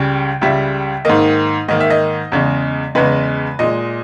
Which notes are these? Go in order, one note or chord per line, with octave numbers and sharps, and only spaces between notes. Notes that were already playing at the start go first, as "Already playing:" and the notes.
Already playing: C#2 C#3 G3 G5
C#2 C#3 G3 E5
G#2 D#3 A#3 D#5
G#2 D#3 A#3 D#5
E5
D#5
E2 C#3 G#3
E2 C#3 G#3 B4
A#2 G#3 D#5